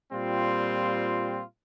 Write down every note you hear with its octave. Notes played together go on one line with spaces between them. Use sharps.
A#2 G3 C4 F4